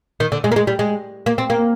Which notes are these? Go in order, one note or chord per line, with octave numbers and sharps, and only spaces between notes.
D#3
D3
G#3
A#3
G#3
G3
G#3
A#3
C4
A#3